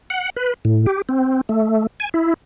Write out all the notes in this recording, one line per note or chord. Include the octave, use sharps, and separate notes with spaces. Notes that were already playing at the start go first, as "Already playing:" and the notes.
F#5
B4
A2
G4
C4
A3
G#5
E4